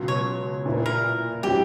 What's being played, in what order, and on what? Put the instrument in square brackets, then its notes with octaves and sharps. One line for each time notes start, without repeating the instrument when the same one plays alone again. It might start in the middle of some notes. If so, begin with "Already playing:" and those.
Already playing: [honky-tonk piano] C#2 B2 F#3
[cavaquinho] C#5
[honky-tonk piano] A#2 A#3 E4 B4
[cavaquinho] A#4
[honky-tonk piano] F#3 C#4 E4 [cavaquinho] G4